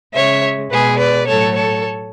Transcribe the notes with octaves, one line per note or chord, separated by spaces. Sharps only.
C#3 G#3 C#5 E5
B2 G#3 G#4 B4
B4 D5
A2 F#3 A3 A4 C#5
A4 C#5